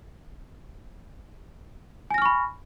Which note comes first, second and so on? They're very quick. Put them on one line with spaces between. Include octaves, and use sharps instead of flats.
G#5 A#6 F6 C#6 B5